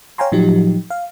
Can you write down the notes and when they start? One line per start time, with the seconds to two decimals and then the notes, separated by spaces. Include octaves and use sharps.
0.18 C#5 F5 G5 G#5 A#5 C6
0.32 A2 F3 F#3 D#4 G4
0.90 F5